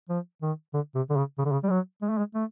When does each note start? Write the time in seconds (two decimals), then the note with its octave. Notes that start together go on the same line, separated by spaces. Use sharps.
0.09 F3
0.42 D#3
0.74 D3
0.95 C3
1.10 D3
1.16 C#3
1.38 C#3
1.45 D3
1.52 C#3
1.63 G3
1.70 F#3
2.02 G#3
2.10 A3
2.18 G#3
2.34 A3